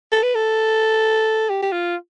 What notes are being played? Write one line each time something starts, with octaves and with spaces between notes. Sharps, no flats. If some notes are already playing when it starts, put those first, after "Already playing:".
A4
B4
A4
G4
G4
F4